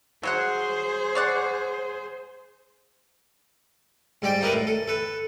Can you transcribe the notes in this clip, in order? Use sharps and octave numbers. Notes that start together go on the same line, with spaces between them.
F#3 G#4 C5 C#5 F#5
C#5 D5 F#5
G#2 G3 D5 G5
D#4 E4 A#4 B4 D#5
A2
A4
A4 B4